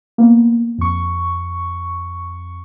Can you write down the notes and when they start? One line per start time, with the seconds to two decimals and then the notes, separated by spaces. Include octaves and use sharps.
0.18 A#3 B3
0.78 F2 C#6